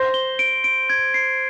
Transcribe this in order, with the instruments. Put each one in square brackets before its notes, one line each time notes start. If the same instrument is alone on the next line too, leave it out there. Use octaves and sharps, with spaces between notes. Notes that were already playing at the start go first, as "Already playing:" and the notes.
Already playing: [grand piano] C5 [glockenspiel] A#6
[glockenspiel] G7
D7
D7
G#6
C7